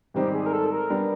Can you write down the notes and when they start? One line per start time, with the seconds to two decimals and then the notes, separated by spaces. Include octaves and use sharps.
0.14 G#2 D#3 G3 C4 D#4 G4
0.34 G#4
0.46 A#4
0.53 A4
0.71 A#4
0.90 G3 B3 D4